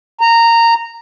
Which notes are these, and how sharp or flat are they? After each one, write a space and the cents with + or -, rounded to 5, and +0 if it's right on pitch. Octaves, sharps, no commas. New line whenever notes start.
A#5 -15